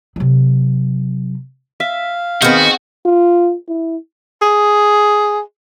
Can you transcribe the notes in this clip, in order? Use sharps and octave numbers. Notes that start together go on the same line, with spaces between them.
C3 F#3
E5 F5
D#3 B3 C4 F#4 G#4
F4
E4
G#4